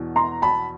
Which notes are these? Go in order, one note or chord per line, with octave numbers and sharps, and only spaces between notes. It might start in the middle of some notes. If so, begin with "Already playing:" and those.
Already playing: E2 B2
A#5 C6
A5 B5